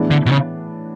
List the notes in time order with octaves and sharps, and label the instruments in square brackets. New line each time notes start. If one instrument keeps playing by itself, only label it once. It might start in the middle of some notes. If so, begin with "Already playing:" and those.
Already playing: [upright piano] A2 E3 B3 D4 G#4
[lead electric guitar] D3
B2
C#3